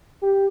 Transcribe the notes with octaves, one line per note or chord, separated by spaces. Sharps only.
G4